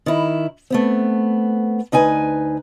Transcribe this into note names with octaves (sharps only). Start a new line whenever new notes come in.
D#3 E4
A3 B3 C4
D2 D#4 B4 G#5